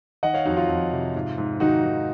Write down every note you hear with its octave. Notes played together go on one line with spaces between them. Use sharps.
D#3 D#5 F#5
C#5 F5
F2 D#4 F#4
F4
F2
C3
G#2
G#2
D#3 D#4 F#4
D#3